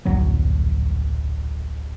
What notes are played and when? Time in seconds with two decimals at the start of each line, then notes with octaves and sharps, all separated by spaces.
0.05 D1 A#1 F#2 F#3